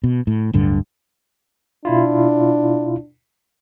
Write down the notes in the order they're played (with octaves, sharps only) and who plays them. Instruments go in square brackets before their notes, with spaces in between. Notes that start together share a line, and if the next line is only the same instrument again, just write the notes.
[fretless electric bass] B2
A2
D1 G2 D3
[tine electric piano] B2 E4 F4 [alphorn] D4